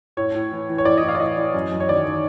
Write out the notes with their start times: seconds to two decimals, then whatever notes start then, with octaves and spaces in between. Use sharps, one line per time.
0.17 A2 C#5
0.35 A2
0.52 E3
0.69 E3
0.78 C#5
0.85 A2 D5
0.98 A2 D#5
1.09 F5
1.15 D5
1.20 E3 D#5
1.37 E3
1.54 F#2
1.71 F#2
1.80 C#5
1.88 D#3 D5
2.05 D#3